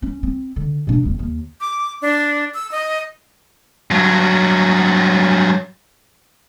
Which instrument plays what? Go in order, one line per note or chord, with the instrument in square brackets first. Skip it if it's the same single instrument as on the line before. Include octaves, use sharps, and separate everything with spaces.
[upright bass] C#4
C4
D3
B2 D4
F1 D#2
D#2
[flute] D6
D4
E6
D#5
[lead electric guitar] G2 F#3